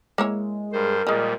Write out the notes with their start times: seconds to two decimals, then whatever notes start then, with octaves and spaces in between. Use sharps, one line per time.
0.18 G#3 A#3 E4 C#5
0.72 G2 A#4 C5
1.07 A#2 F3 G3 G#3 D#5